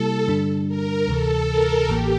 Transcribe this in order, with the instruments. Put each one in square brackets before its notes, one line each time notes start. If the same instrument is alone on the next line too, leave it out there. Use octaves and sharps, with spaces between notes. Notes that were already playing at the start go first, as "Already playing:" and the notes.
Already playing: [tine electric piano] C3 G3 A#3 E4 G4 [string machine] A4
[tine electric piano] G2 D3 G3 D4
[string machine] A#4
[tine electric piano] D2 C3 E3 [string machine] A4
[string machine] A#4
[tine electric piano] A1 A2 E3 A#3 [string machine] G4